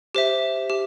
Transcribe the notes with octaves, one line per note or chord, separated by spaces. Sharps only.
G4 C5 E5
G4